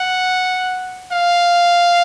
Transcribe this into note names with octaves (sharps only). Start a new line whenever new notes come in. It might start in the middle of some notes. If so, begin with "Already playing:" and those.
Already playing: F#5
F5